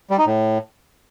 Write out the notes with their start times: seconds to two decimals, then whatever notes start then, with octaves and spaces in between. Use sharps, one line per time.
0.10 G3
0.18 D#4
0.26 A2